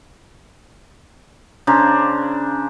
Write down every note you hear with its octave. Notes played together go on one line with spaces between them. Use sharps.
C#3 D4 C5 A#5